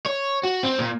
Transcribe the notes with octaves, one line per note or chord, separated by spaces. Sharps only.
C#5
F#4
C4
A#2